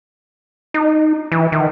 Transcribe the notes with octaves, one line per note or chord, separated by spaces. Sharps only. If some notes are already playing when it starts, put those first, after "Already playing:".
D#4
E3
D#3